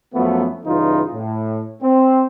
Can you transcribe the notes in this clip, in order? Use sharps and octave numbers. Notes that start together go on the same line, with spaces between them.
F#2 F3 A3 B3
G2 C#3 E3 D#4 F4
A2
C4